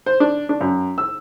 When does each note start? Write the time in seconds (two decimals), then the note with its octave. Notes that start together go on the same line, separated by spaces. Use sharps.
0.06 C5
0.20 D4
0.49 D4
0.60 F#2
0.98 E6